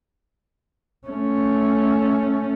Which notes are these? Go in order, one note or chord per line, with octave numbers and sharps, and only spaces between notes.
A3 C#4